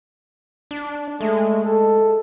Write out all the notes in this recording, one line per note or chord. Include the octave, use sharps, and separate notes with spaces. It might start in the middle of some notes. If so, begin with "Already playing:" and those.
D4
G#3 A3
A4